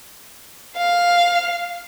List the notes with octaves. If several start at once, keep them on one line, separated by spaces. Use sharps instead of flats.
F5